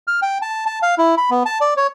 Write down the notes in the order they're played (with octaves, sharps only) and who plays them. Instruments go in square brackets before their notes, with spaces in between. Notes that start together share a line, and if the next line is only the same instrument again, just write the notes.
[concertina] F6
G5
A5
A5
F5
E4
B5
B3
A5
D5
C#5